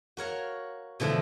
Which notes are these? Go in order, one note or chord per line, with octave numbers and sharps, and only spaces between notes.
F#4 A#4 C#5 F5
B2 D3 E3 F3 A3